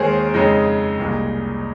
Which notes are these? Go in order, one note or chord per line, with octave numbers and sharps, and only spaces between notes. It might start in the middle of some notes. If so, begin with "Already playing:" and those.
Already playing: D#2 D#3 G#3 G#4 A#4 C5 C#5
F2 C#3 G#3 D#4
C2 A#2 G#3